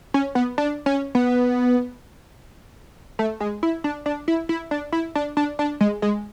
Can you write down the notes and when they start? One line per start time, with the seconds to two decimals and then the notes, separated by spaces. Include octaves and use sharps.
0.14 C#4
0.35 B3
0.58 D4
0.86 C#4
1.15 B3
3.19 A3
3.40 G#3
3.63 E4
3.84 D4
4.06 D4
4.28 E4
4.49 E4
4.71 D4
4.92 E4
5.15 D4
5.37 D4
5.59 D4
5.81 G#3
6.02 G#3